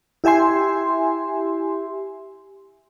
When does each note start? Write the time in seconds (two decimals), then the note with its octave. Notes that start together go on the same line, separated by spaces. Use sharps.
0.24 E4 G4 E5 G#5 C6